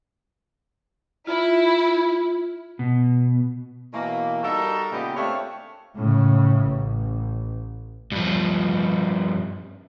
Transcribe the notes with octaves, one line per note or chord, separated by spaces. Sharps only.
E4 F4
B2
B2 E3 F#3 A#3
G3 D#4 F#4 A4 A#4 E5
A#2 C#3 G#3 B3 G4
A3 C4 D4 C#5 E5 F5
A2 C#3
A1
G2 F3